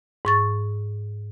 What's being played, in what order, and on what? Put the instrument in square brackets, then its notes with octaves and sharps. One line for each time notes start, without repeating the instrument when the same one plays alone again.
[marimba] G#2 C#6 A6